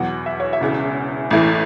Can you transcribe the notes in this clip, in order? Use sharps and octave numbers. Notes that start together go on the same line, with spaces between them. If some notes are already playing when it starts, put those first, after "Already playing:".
Already playing: E2 B2 F#3 F#5
E5
C#5
E5
E1 E2 C#3
A1 A2 E3